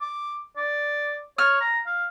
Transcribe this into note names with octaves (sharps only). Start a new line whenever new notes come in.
D6
D5
C#5 F6
A#5
F5